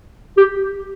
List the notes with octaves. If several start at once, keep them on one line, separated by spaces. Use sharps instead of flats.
G4